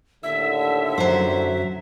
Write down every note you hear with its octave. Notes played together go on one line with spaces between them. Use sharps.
D#2 A2 D3 E5 E6
F#2 F#3 C5